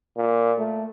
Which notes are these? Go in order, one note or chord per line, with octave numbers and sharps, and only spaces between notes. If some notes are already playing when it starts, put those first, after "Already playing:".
A#2
A3